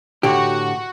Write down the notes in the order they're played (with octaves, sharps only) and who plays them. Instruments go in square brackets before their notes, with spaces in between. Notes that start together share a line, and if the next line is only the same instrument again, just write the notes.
[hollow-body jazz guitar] A2 D3 G4 [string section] F#4